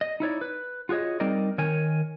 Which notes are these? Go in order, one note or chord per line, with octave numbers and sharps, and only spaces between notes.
D#5
D#4 E4 C#5 D5
B4
F4 F#4 G#4 C#5 D#5
G3 C4 D#4 A#4 D5 D#5
D#3 A#4 C#5 G#5